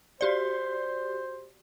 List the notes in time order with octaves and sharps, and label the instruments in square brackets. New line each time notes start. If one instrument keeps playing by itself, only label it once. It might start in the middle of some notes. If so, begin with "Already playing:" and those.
[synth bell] F#4 G4 D5 [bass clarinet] C5